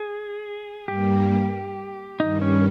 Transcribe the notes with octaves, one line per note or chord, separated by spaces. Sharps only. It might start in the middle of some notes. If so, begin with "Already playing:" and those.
Already playing: G#4
G2 G3 A#3 G4
G2 D#3 G3 D#4
C#4